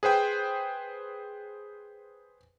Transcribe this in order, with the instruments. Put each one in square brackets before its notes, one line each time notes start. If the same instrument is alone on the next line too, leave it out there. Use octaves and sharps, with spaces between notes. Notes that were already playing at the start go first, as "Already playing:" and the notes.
[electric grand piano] G#4 B4 C5 G5